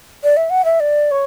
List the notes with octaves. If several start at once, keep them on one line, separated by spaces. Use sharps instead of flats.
D5
E5
F#5
E5
D5
C#5